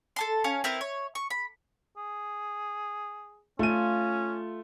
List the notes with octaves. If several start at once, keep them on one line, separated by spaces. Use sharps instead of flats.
A4 A5 C6
C#4 C#5 F5
C4 E4 A#4 B4
C#5
C#6
B5
G#4
A3 C#4 F4 D#7